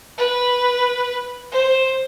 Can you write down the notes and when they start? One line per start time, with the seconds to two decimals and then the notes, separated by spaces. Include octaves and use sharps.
0.18 B4
1.52 C5